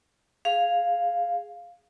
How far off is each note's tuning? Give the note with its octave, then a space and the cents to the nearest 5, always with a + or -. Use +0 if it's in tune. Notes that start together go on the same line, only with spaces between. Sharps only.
G#4 +0 F5 +0